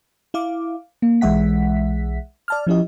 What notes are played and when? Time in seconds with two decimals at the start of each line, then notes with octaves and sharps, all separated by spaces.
0.34 E4 F5 D6
1.02 A#3
1.21 B1 E3 G#3 E5 F#5 B6
2.48 D5 A5 F6
2.67 F3 C#4 E4 G4 D#5